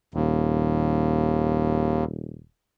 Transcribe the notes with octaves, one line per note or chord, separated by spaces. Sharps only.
D#1 D#2